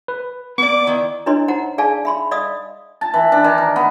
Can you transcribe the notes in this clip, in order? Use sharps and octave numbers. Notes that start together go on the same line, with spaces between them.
B4
A#3 B3 D5 D6
D#3 E4
D4 E4 B4 C#5 D#5 C6
D#4 C5 F#5 A#5
G#4 D5 F5 G#5 A5
E5 B5 C6
D5 D#5 F5 D#6
A5
E3
D4
D#3
A#4
B3